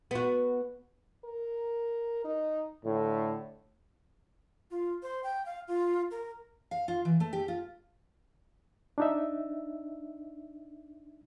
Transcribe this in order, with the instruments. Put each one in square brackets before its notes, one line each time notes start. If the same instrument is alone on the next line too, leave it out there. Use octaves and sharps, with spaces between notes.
[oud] B3 F#4
[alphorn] A#4
D#4
[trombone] A2 [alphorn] D3
[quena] F4
C5
G5
F5
F4
A#4
[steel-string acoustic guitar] F5
F4
E3
A3
G4
F4
[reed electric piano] D4 D#4 E5